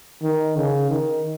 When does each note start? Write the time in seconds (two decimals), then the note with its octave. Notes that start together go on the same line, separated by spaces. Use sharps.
0.23 D#3
0.57 C#3
0.90 D#3